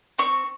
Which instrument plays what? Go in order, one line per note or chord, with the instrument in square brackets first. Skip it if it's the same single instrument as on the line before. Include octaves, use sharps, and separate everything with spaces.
[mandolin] C4 C#6